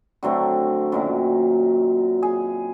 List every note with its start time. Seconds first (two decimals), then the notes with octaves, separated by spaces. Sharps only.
0.23 D3 F#3 A3 C4
0.92 F#2 A#2 D#3
2.23 G#4